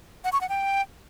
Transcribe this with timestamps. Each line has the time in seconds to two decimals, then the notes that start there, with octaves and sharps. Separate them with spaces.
0.24 F#5
0.33 C#6
0.41 F#5
0.49 G5